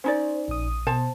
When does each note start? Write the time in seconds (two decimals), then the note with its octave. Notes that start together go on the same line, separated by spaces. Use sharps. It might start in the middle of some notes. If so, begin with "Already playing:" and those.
0.04 C#4 D#4 C5 D5
0.48 A#1 D#6
0.87 B2 C5 A5